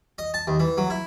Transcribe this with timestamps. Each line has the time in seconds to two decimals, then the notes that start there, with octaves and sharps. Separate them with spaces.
0.18 D#5
0.34 A5
0.47 D#2
0.60 E3
0.78 F#3
0.90 E4